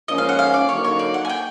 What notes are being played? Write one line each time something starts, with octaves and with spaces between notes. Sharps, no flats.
G#2 F3 A#3 C#4 D#5
F5
F#5
F5
D5
D3 F#3 A#3 D#4 C#5
C#5
D5
F#5
G#5
G5